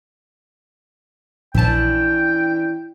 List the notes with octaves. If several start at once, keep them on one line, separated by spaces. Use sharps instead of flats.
A#1 E3 C#4 D4 G5 A5